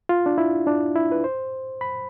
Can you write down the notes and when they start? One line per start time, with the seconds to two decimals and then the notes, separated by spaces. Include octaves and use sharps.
0.09 F4
0.26 D4
0.38 E4
0.67 D4
0.96 E4
1.12 B4
1.24 C5
1.81 B5